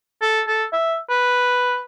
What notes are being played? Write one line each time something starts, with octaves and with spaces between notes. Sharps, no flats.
A4
A4
E5
B4